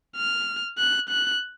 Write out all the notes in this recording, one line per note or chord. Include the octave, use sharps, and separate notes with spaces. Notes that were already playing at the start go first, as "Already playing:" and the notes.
F6
F#6
F#6